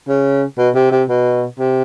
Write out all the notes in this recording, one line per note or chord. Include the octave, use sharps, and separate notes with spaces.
C#3
B2
C3
C3
B2
C3